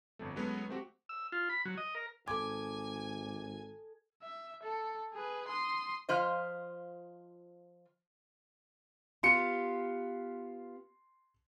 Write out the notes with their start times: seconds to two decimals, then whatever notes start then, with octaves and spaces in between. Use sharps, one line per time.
0.19 G1 F2 A3
0.36 F#3 G#3 A3 B3 C#4
0.69 A3 C4 F#4 G4
1.09 E6
1.32 F4
1.49 B5
1.65 F#3
1.77 D#5
1.95 A#4
2.28 G#1 A4 G#5 D6 G#6
4.22 E5
4.63 A4
5.13 G#4 B4
5.48 C6 D#6
6.09 F3 F4 C5 D#5
9.23 B3 F4 G4 C6 C#7